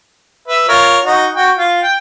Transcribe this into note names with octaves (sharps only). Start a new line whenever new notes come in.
B4 E5
F4 A#4 C#5
D#4 F#4
F#4 G5
F4
G5